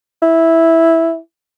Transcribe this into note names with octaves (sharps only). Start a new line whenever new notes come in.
E4